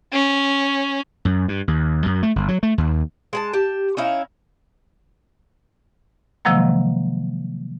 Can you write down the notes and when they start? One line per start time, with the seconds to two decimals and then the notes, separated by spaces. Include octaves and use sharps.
0.13 C#4
1.25 F#2
1.48 G2
1.68 D#2
2.06 F#2
2.23 A3
2.36 G1
2.48 F#3
2.63 A3
2.78 D#2
3.33 G#3 G#5 A5
3.53 G4 A5
3.97 C#4 D#4 E4 F5
6.45 C3 D#3 F3 F#3 G#3 A#3